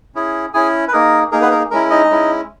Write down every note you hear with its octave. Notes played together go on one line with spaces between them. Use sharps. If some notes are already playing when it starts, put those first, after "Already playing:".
C#4 E4 G#4
C#4 E4 G#4 G#5
B4
A#3 D#4 G#4 A#4
A#3 D#4 G#4 A#4
B3 B4
A#4
G#3 C#4 E4 A#4
D#4 D#5
G#3 C#4 E4